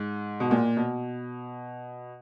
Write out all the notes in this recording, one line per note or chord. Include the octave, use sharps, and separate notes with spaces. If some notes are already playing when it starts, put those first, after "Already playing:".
Already playing: G#2
B2
A#2
B2